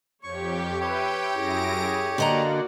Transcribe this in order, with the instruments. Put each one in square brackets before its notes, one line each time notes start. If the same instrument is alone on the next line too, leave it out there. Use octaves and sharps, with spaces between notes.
[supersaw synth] F2 G4 [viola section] C#5 [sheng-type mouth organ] C#6
[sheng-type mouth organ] G4 C#5 [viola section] B4 E5 [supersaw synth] G5
[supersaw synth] F#2 A#6 D7 [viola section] E4 G#4
[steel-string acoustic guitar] D3 D#5 A#5 [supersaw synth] A#3 [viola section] F#4 D5 F#5